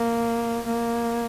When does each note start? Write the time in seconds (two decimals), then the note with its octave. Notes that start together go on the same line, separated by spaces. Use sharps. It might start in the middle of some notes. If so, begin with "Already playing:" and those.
Already playing: A#3
0.66 A#3